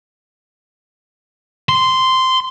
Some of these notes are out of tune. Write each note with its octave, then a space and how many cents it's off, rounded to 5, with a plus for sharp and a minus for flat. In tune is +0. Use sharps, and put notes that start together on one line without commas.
C6 -10